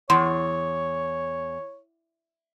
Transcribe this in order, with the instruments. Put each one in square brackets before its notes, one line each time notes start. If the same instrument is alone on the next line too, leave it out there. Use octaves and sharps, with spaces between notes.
[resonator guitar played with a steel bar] E2 [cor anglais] C#5 [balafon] C6